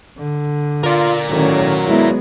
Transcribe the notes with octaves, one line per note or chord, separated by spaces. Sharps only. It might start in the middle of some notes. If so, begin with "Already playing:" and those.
D3
F4 A#4 D5
A2 D#3 F#3 C#4
G#3 B3 E4